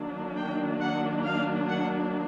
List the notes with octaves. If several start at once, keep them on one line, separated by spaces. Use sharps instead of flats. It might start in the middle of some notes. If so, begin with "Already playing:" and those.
Already playing: D#3 F#3 A#3 D4
G5
F#5
F5
F#5